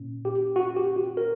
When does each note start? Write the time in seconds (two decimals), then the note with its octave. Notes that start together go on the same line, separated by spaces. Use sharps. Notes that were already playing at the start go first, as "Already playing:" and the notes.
Already playing: A#2 A#3 C#4
0.25 G4
0.56 F#4
0.76 G4
0.96 F#4
1.17 A#4